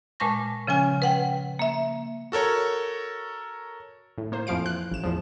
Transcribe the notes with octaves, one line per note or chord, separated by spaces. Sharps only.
A#2 G#3 A5 C#6 A#6
C#3 F3 C#4 G#5 F6
B4 F#5 G5
A#3 E5
F#4 A4 A#4 C#5
A2
A#3 C5
F2 E3 F3 F5 D7
F#6
A1 E7
E2 F3